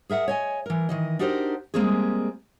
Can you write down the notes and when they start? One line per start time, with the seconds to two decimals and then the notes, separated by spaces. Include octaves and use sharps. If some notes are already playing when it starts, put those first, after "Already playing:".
0.10 G#4 A#4 E5 F#5
0.28 C#5 D#5 G#5
0.66 E3 A#4
0.89 D#3 E3 D#5
1.19 D4 D#4 F#4 G4 A#4 C5
1.74 G3 G#3 A#3 C4 F#4 G#4